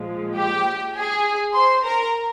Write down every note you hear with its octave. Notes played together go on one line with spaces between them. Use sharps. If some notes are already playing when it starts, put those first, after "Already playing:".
Already playing: A#2 F3 G#3
G4 G5
G#4 G#5
C5 C6
A#4 A#5